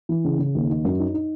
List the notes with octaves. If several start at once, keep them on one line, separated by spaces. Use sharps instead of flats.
E3
C#3
C#3
D#2
D#4
F#2
D#4
D#4